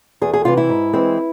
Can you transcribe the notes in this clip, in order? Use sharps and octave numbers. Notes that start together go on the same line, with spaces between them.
E2 G#4
G#4
C3 E3 F4
E4
G#2
E3 G#3 C4